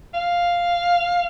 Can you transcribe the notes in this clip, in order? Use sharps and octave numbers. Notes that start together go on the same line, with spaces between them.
F5